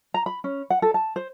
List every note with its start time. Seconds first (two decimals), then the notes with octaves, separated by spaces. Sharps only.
0.14 A#5
0.26 B5
0.44 C#4
0.70 F#5
0.82 A4
0.94 A5
1.16 C5